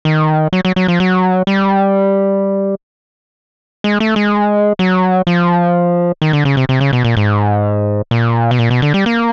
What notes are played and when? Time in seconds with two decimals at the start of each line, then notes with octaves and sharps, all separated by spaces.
0.05 D#3
0.53 F#3
0.65 F#3
0.76 F#3
0.88 F3
1.00 F#3
1.47 G3
3.84 G#3
4.00 A3
4.16 G#3
4.79 F#3
5.27 F3
6.22 D#3
6.33 D3
6.45 C#3
6.57 C3
6.69 C3
6.81 C#3
6.93 B2
7.05 A#2
7.17 G#2
8.11 A#2
8.51 B2
8.59 A#2
8.71 B2
8.82 D3
8.94 G3
9.06 A#3